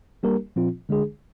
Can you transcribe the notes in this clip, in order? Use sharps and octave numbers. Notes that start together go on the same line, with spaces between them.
G3 A#3 D4 G4 A#4
A#2 F3 C4 F4
D3 G#3 D4 G#4